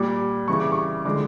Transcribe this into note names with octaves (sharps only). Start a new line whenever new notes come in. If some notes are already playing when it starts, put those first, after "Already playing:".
Already playing: A#2 G3 D6
C#3 E3 G3 C#6
D6
C#6
D3 F3 G#3 D6